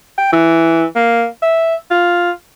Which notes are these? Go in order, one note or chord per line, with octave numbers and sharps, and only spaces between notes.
G5
E3
A#3
E5
F4